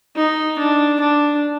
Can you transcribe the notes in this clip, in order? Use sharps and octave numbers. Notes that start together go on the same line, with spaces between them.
D#4
D4
D4